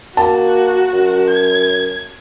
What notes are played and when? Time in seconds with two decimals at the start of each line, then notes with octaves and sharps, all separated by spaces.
0.17 A#3 F#4 A5
0.93 F#2
1.30 G#6